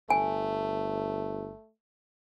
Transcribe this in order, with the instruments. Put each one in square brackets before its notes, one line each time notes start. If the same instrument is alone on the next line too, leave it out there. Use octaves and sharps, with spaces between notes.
[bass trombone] G1 [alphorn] A3 [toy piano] G#5